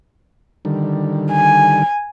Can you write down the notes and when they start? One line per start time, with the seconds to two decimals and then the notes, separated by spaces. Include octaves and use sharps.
0.65 D3 D#3 G3
1.32 G#5